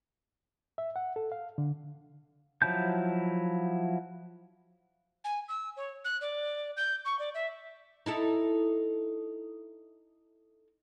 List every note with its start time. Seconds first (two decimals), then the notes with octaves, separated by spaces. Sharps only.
0.78 E5
0.96 F#5
1.16 A4
1.32 F5
1.58 D3
2.62 F3 F#3 E4 A5 G6
5.24 G#5
5.49 E6
5.77 C#5
6.05 F#6
6.21 D5
6.77 G6
7.05 C#6
7.19 D5
7.34 E5
8.06 D#4 E4 A4